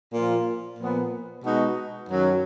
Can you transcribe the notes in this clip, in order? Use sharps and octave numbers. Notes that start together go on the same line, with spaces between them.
A#2 F3 A#3 F4
A#2 F3 B3
B2 G#3 D#4 F#4
F#2 D#3 F#3